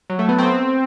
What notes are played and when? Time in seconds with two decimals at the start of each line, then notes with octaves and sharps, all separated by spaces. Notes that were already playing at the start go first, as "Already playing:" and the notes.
0.10 F#3
0.19 A3
0.29 B3
0.38 C4